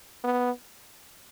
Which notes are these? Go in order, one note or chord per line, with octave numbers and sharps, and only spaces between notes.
B3